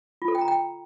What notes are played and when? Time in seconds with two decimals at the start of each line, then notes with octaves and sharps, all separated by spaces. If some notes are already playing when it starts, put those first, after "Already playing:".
0.22 F4
0.28 A4
0.35 G5
0.41 A#5
0.48 G5